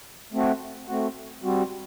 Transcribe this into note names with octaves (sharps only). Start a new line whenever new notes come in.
A3 C4 F#4
A3 C4 F#4
G3 C4 F#4